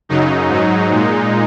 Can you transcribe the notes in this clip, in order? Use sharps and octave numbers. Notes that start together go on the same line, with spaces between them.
F#2 C#3 F#3 D#4
G#2 F#3
A#2 G#3